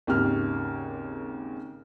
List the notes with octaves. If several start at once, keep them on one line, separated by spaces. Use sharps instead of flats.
G#1 D#2 C#3 G4 F6